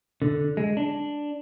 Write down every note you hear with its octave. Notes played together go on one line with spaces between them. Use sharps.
D3
G#3
D4